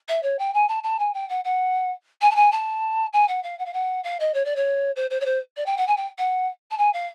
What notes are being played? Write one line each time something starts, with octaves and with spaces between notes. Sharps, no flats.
E5
C#5
G5
G#5
A5
A5
G#5
G5
F#5
F#5
G#5
A5
G#5
A5
G#5
F#5
F5
F#5
F5
F#5
F5
D#5
C#5
D5
C#5
C5
C5
C#5
C5
D5
G5
F#5
G#5
G5
F#5
A5
G#5
F5